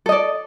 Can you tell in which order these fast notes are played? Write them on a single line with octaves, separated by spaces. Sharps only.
A4 D#5 D5